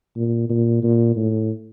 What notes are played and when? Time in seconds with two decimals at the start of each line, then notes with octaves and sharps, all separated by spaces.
0.16 A#2
0.50 A#2
0.83 A#2
1.16 A2